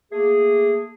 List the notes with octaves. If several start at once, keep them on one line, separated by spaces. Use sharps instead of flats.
A3 A#3 G#4